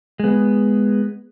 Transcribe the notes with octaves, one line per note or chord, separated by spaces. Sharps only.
G#3 B3